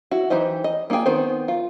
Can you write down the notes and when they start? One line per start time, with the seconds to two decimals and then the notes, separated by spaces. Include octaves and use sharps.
0.11 E4 F#4
0.30 E3 D#4 G4 C5 D#5
0.64 D#5
0.90 A#3 D#4 F4 G#4 G5
1.06 D#3 B3 C4 C5
1.48 F4